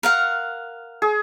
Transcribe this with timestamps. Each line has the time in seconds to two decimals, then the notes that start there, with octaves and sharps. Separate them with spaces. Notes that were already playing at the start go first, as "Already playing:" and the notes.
0.03 A#4 F5 F#5
1.02 G#4